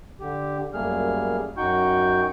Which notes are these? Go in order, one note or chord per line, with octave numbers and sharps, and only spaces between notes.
D3 G4
F#2 G3 A3 A#3 G#4 F6
F#2 D#4 F#4 G5 C#6 G6